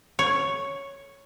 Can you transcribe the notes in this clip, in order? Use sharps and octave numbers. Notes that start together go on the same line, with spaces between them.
C#5